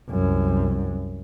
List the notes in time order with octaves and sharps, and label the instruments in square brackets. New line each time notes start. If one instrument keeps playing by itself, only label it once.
[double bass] C2 F#2